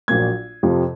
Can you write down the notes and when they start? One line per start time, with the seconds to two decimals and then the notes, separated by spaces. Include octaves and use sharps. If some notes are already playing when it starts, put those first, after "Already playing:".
0.08 A#1 A#2 F#3 A#3 G#6
0.63 F2 C3 F3